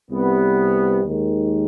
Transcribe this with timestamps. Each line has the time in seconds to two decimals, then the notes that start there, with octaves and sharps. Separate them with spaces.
0.10 C2 C3 G3 B3
1.04 D#2 D#3 G#3